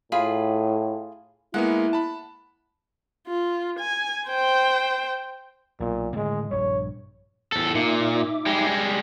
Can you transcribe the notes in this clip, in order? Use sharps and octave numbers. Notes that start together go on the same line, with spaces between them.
A2 F4 G#4 B5
G#3 A#3 B3 E4 F#5
A5 B5
F4
G#5
C5 G5
B1 A#2
A2 D3 D#3 G#3
A#1 G2 G3 C#5
E2 A4
A#2 D#4 E5 D6
G3 G#3